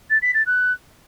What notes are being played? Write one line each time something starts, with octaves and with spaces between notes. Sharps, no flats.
A6
B6
A6
F#6